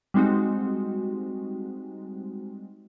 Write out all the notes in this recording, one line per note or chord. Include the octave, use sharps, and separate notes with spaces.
G3 G#3 C4 D#4 F#4